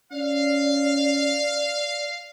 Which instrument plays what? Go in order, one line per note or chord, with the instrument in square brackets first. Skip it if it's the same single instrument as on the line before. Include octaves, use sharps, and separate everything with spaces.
[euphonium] C#4 [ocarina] D5 [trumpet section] F5